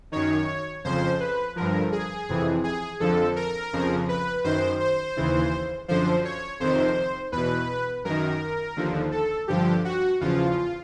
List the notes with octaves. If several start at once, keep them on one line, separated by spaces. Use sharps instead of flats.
F#2 D#3 C#5
F2 C#3 F3 C5
B4
G2 D3 F3 A#4
G#4
F2 C3 E3
G#4
F2 D3 F3 A4
A#4
F2 C#3 F3
B4
F#2 D#3 C5
C5
D#2 C#3 E3
F#2 D3 F3 C5
C#5
F2 C3 D#3 C5
E2 B2 B4
F#2 D#3 A#4
D#2 D3 F3
A4
G2 D3 F3 G4
F#4
E2 C#3 F3 F4